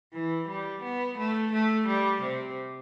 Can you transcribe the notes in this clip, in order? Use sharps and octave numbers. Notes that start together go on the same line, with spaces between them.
E3
G3
B3
A3
A3
G3
C3